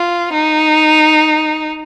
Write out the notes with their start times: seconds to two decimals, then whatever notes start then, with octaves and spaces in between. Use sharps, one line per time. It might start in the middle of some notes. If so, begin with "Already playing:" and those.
Already playing: F4
0.33 D#4